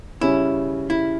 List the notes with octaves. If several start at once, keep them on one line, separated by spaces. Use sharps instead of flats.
C#3 G3 C#4 E4
E4